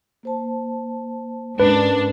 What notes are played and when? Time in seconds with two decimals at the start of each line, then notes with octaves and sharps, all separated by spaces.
0.23 A#3 C5 A5
1.60 G#2 C#4 D4 A#4 B4